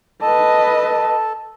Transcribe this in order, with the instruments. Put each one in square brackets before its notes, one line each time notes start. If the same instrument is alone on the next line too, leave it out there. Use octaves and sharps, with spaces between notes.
[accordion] A4 A5 [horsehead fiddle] B4 D#5